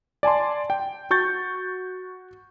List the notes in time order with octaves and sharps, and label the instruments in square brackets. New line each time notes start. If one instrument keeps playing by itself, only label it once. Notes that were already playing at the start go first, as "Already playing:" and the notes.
[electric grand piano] D5 G#5 A5 C6
G5
F#4 C#6 G6 A6